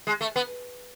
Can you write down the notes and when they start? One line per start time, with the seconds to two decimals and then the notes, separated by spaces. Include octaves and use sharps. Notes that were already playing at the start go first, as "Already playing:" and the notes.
0.07 G#3
0.21 A3
0.36 B3